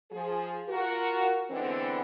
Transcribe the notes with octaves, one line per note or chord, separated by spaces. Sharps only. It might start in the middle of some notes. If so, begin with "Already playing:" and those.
F3 G#4
F4 F#4 A#4
D3 E3 G#3 B3 C4